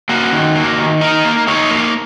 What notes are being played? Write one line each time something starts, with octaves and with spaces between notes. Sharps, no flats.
A#3 F#4
D#3
A#3
D#3
D#4 A#4
A#3
D#4 C#5
A#3